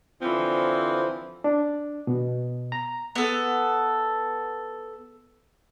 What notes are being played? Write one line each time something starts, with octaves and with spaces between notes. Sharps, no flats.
D3 E3 F3 C4
D4
B2
A#5
B3 A4